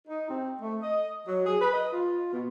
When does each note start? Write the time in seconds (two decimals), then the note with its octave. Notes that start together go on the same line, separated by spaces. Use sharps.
0.07 D#4
0.29 C4
0.60 A3
0.82 D#5
1.28 F#3
1.46 G#4
1.61 B4
1.73 D#5
1.93 F4
2.32 B2